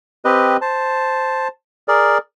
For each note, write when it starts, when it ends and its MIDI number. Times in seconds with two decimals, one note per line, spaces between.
0.25 0.57 60
0.25 0.57 67
0.25 0.57 71
0.25 0.57 75
0.61 1.48 72
0.61 1.48 81
1.88 2.18 68
1.88 2.18 70
1.88 2.18 74